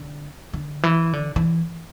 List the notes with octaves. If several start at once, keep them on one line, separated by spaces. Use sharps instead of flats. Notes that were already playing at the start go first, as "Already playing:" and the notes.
Already playing: D3
D3
E3
D3
E3